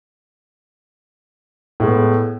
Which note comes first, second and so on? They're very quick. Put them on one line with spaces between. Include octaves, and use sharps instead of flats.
A2 G#3 B3